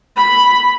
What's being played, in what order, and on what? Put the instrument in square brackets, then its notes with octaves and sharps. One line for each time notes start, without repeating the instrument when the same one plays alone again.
[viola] B5